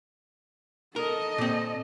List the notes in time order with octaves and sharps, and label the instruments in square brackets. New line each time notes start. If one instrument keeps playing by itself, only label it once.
[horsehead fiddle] A4 D#5 [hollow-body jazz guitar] A#4
[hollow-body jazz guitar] A#2 C4